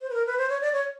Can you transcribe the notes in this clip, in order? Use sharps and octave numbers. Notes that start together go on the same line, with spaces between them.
C5
B4
A#4
B4
C5
C#5
D5
C#5